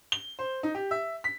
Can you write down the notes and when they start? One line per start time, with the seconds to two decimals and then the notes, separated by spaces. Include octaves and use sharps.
0.12 G7
0.39 C5
0.63 D#4
0.75 G4
0.91 E5
1.24 B6